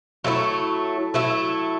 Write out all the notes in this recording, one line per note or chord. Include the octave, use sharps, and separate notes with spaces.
F#3 A3 E4
F#3 A3 E4